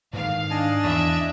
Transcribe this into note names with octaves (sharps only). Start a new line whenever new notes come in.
G#2 D#3 F5
D4 D#5 G#5 A5
E2 E5